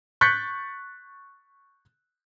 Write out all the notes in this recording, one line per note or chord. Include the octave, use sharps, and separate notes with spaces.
C#6 F#6 G6 A6 B6 C#7